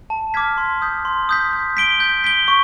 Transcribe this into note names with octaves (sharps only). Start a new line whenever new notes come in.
A5
D6 F6 G#6 B6
C6
D#6 G6 B6
C6
D#6 G6 B6
G6
B6 D7 G7
G6
B6 D7 G7
C#6